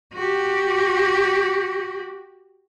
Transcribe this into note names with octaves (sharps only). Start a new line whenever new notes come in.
F#4 G4